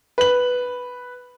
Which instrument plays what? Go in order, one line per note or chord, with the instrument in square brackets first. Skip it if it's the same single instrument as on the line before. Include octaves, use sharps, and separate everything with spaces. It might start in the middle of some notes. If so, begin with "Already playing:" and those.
[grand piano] B4 F#7